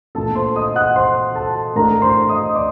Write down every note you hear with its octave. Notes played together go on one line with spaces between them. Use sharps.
A#2 A3 D4 A4 A5
C5 C6
D#5 D#6
F#5 F#6
C5 C6
A4 A5
A2 A3 D4 A#4 A#5
C5 C6
D#5 D#6
D5 D6